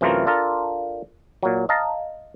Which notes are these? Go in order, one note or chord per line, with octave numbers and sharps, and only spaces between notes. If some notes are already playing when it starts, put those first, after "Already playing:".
F#2 C3 E3 A3 F4 A#4
D4 F4 A4 A#4
A#2 F#3
D#5 F5 A5 A#5